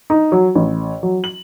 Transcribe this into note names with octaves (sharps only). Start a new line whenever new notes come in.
D#4
F#3
A1
F#3
F#7